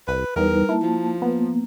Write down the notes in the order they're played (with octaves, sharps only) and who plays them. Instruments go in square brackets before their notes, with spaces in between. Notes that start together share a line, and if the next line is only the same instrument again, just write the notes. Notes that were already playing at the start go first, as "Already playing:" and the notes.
[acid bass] C2 [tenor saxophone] B4
[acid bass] E2 [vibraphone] G3 D#4 B4 [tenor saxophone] A#4
[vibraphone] A#3 A5 [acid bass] E4
[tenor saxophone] F3
[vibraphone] A#3 [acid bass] B3